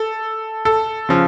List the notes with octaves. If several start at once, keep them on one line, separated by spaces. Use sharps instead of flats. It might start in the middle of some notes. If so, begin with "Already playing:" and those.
Already playing: A4
A4
C#3 F3